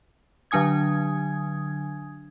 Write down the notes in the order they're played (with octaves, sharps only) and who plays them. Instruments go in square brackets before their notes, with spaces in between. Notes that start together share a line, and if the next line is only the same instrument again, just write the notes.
[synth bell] D3 F#3 D4 G#5 D#6 G#6